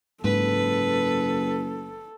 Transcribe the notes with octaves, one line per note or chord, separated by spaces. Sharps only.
F#1 G#2 A4 B4